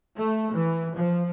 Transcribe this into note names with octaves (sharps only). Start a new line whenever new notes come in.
A3
E3
F3